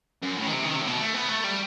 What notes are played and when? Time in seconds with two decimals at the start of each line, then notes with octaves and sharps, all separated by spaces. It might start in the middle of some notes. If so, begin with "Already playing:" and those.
0.23 F#2
0.38 A2
0.47 D#3
0.53 C3
0.65 D#3
0.76 C3
0.82 A2
0.87 B2
0.99 A3
1.14 B3
1.29 A3
1.44 G3